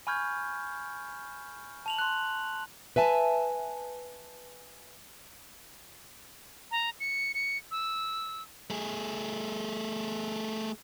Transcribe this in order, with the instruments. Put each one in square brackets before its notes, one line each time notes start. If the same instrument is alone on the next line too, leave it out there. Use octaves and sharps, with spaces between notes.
[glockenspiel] G#5 B5 C#6 F6 G6 G#6
A5 F7 F#7
C6 F#6
[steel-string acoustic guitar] B4 E5 G#5 A5
[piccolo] A#5
C#7
C#7
E6
[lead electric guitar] A3 G#4